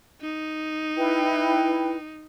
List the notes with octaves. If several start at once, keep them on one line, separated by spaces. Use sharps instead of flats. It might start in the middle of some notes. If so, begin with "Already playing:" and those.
D#4
E4 B4 G5